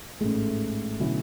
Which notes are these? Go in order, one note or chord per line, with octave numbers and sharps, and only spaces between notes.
A1 G#2 G#3 A3
B2 D3 F#3 C#4 E4